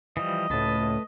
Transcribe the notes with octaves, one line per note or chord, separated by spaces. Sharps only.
E3 F3 G3 D#5
C#2 A2 A3 B4 A5